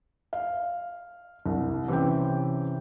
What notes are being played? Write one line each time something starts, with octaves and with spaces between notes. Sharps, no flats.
F5
C2
C3 E3 C#4 G5